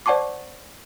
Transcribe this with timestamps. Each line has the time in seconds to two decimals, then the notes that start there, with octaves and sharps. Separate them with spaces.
0.06 C5 D5 F#5 A5 C#6 D6